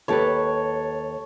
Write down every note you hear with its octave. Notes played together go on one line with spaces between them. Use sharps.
D#2 G4 A4 B4 C#5